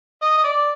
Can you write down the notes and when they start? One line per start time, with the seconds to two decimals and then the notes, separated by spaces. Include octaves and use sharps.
0.22 D#5
0.37 D#5
0.44 D5